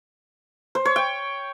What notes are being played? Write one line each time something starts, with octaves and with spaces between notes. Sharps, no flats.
C5
C#5
G5